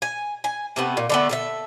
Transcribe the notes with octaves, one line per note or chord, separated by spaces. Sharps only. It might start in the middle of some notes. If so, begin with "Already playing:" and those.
G#5
G#5
C3 A3 B3
A#2
D3 A3 B3
A4 A#4 E5